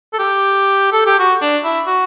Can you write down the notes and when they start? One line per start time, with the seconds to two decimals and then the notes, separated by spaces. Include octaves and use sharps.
0.13 A4
0.19 G4
0.92 A4
1.06 G4
1.19 F#4
1.42 D4
1.64 E4
1.87 F#4